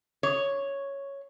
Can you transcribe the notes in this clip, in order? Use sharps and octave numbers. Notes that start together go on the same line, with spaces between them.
C#5